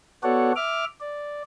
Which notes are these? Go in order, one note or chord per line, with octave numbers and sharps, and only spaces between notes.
B3 F#4 A4 C#5 D5 F#5
E5 D6 F6
D5